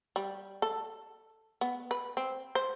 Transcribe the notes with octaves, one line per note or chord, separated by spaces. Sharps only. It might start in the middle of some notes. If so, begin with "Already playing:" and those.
G3
A4
B3
B4
C4
C5